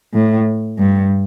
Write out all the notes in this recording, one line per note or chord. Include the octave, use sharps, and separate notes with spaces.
A2
G2